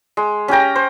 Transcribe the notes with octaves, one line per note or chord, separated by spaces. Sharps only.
G#3
C#4 G4 G5 A#5
C5